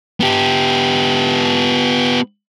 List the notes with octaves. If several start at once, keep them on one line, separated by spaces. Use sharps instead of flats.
B3 G4